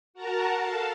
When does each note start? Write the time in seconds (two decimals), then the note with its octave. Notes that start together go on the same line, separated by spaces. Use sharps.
0.14 F#4 A#4 F#5 A5 A#5
0.60 A4 F5 A5